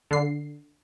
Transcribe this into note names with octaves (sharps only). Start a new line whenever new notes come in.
D3 C7